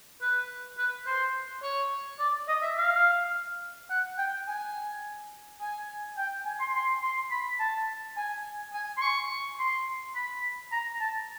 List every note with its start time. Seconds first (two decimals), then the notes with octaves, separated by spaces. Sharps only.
0.22 B4
0.78 B4
1.06 C5
1.63 C#5
2.19 D5
2.48 D#5
2.62 E5
2.77 F5
3.90 F#5
4.18 G5
4.48 G#5
5.61 G#5
6.18 G5
6.46 G#5
6.60 C6
6.74 C6
7.03 C6
7.31 B5
7.60 A5
8.17 G#5
8.73 G#5
8.97 C6
9.02 C#6
9.59 C6
10.15 B5
10.72 A#5
11.00 A5